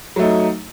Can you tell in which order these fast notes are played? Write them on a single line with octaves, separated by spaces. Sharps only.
F#3 A3 D#4